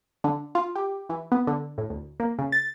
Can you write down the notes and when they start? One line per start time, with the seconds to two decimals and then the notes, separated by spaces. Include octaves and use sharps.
0.24 D3
0.55 F4
0.75 G4
1.09 E3
1.32 B3
1.47 D3
1.78 A2
1.90 D2
2.20 A#3
2.39 C#3
2.52 A6